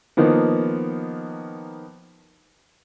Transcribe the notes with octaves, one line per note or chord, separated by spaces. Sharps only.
D#3 F3 A#3 B3